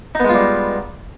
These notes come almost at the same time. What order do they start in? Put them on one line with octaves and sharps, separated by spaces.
D#4 B3 G#3 F4 G3